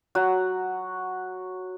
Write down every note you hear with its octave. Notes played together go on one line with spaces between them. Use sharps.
F#3 F#4 F#5